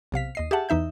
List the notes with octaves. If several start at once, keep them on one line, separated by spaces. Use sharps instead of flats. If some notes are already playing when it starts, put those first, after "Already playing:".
B1 C3 F5 B6
D#2 D#5 C7
G4 G#4 E5 F#5 A5
E2 E3 D#4 E5 G6